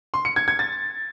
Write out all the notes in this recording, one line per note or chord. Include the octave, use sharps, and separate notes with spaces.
C6
C#7
G#6
G#6
A6